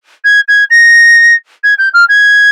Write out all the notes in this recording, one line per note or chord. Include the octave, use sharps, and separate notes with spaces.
G#6
G#6
A#6
G#6
G6
F6
G#6